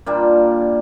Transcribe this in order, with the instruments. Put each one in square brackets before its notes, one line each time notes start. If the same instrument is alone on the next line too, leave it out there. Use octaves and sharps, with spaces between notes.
[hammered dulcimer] A#2 G3 A#3 D4